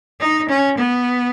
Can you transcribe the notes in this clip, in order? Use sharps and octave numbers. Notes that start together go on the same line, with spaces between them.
D#4
C#4
B3